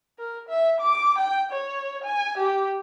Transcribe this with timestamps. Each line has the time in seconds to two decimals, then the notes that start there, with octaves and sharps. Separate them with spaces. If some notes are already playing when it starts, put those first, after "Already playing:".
0.19 A#4
0.49 E5
0.80 D6
1.18 G5
1.52 C#5
2.04 G#5
2.38 G4